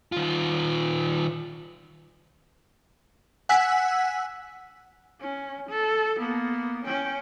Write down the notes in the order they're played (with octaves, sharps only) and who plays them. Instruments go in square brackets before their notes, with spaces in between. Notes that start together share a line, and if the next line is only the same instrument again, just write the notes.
[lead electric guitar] D#3 F4
[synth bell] F#5 G#5 E6 F#6 B6
[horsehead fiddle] C#4
A4
A#3 B3
C#4 G5